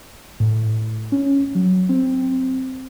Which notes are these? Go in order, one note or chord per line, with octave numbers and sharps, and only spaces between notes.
A2
C#4
F#3
C4